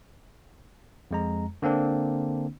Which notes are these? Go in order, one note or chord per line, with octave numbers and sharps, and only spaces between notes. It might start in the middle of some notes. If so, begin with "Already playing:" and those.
F2 G#3 A#5
D3 A#3 C4 D4